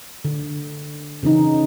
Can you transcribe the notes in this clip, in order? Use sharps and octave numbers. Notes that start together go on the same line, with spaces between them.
D3
C#3 E3 C#4 D#4